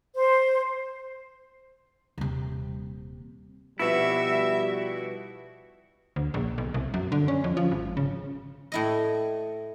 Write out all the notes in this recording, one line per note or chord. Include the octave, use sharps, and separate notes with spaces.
C5
D#1 C3
B2 F3 G3 B3 E4 F#4 E5
D2
A#1
B1
C2
F#2
D3
C#4
F2
F3
G#1
C#3
A2 E4 D#5